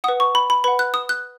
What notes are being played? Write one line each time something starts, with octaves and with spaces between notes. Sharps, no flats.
B4 F#5 D#6
C#6
B5
B5
B4 F#5 B5
F#6
D#6
F#6